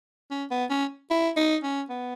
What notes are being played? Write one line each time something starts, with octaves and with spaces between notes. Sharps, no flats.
C#4
B3
C#4
E4
D#4
C#4
B3